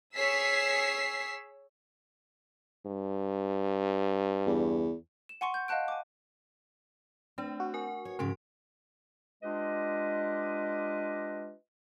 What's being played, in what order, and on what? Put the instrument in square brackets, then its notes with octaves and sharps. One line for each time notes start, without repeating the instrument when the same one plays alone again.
[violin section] G#4 C#5 E6 B6 C7
[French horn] G2
[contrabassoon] E2
[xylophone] E7
F#5 G#5 C6 C#6 C#7
G6
D#5 F5 F#5 A5 F#6 D7
G#5 D6
[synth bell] A3 D4 [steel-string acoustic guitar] C4
[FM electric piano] F#4
[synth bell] A#4 G#5
[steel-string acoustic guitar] C#5
[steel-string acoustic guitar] F2 G#2 C#3 [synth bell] F3 C6 D7
[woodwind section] G#3 D4 F4 G4 B4 D#5